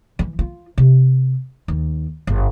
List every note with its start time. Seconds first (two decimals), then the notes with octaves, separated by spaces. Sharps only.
0.19 E3
0.39 F4
0.78 C3
1.68 D#2
2.27 G1